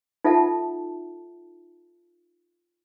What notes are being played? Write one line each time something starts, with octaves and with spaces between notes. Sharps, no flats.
D#4 F4 A4 E5 F#5 A5